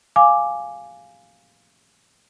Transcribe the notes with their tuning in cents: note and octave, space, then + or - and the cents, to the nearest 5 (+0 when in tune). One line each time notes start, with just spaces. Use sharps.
F5 +0 G#5 +0 D6 +0